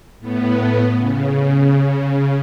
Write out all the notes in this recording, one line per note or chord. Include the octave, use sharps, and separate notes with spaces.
A2 B3
C#3